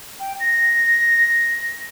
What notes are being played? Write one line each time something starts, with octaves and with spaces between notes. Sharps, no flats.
G5
A#6